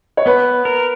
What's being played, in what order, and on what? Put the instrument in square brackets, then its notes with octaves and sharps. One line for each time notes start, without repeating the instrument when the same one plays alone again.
[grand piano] C#5
[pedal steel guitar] B3 [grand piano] B4
[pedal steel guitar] A#4